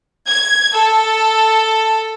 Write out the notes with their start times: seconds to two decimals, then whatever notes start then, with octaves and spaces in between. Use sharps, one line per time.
0.29 G#6
0.74 A4